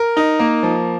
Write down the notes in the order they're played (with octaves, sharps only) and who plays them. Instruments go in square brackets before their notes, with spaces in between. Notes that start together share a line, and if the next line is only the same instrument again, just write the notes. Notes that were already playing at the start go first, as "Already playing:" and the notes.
Already playing: [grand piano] A#4
D#4
A#3
F3